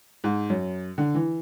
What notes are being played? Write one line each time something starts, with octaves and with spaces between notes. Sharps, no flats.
G#2
F#2
D3
E3